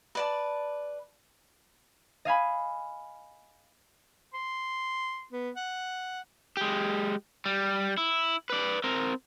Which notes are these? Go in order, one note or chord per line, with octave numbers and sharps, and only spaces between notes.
B4 D5 A5
D#5 F5 G#5 B5
C6
B3
F#5
G#3 G4
G3
E4
B4 D5
C4 A#4